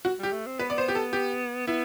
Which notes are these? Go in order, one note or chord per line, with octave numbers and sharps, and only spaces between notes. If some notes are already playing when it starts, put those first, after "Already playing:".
F#4
G3 G4
A3
C4
B3 B4
D5
C5
G4
A4
G4
B3 E4